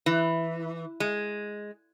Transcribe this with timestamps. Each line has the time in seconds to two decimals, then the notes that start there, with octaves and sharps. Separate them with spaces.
0.06 E3
1.00 G#3